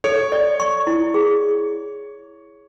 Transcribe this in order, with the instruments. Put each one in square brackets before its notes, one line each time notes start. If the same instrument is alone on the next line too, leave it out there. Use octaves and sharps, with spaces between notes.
[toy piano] A4 [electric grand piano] C#5
[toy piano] D5
C#6
E4
G#4